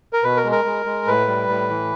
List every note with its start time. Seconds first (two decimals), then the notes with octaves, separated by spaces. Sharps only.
0.13 A#4
0.24 B2 B4
0.37 A#4
0.44 G#3
0.52 A#4
0.65 G#3
0.86 G#3
1.07 A2 B4
1.28 G3
1.49 A2
1.70 E3